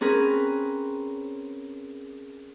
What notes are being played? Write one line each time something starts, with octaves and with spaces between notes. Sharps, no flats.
C4 C#4 G#4 A#4 B4